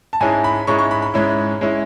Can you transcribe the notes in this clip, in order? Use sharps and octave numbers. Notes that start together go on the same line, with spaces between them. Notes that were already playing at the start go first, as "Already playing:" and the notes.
A5
G#2 G#3 C#4 E4 G#5
B5
G#2 G#3 C#4 E4 C#6
C#6
B5
B5
G#2 G#3 C#4 E4
G#3 C#4 E4